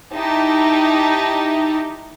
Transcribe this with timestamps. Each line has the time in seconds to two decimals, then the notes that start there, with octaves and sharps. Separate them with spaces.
0.13 D#4 E4 G4 A5